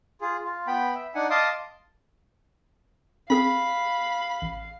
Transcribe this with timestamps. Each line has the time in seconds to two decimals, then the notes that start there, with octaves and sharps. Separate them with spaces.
0.21 F4 G#4
0.44 F4
0.67 B3 G5 B5
0.95 E5
1.15 D4 D#4 F#5 G#5
1.30 D#5 F5 A5 C6 D6 D#6
3.30 C4 G#4 F5 B5
4.42 A1